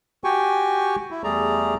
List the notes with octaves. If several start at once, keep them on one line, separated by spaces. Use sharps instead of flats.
F#4 G4 G5 G#5 C#6
E4
E2 G3 A3 G#4 D5 A#5